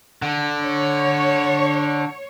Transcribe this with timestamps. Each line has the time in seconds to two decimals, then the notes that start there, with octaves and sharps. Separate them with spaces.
0.22 D3
0.62 C#5